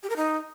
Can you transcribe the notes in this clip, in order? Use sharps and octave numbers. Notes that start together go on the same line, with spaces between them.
G4
A#4
D#4